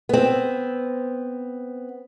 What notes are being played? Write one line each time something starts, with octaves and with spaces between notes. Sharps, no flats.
B3 C4